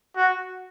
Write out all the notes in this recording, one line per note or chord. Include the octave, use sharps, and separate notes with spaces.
F#4